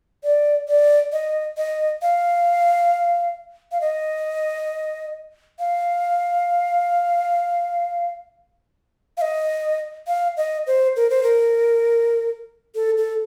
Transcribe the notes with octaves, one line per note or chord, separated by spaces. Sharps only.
D5
D5
D#5
D#5
F5
F5
D#5
F5
F5
D#5
F5
D#5
C5
A#4
C5
A#4
A4
A4